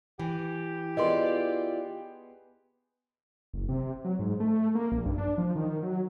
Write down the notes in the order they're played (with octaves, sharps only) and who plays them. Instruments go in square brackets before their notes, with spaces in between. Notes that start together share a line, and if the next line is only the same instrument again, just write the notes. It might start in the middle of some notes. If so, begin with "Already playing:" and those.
[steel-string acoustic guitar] E3 [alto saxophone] G4
[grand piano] B3 G#4 B4 [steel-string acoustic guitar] E4 F4 D5 [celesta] D#5 C6
[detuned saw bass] F#1
C3
F#3
G#2
A3
A#3
A#1
G2
D4
F3
D#3
F#3